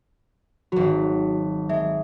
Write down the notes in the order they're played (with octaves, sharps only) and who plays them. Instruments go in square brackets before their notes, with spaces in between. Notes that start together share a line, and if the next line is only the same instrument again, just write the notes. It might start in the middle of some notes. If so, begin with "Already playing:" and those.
[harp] G#1 F#3 [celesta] F#4
[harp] G#3 [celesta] E5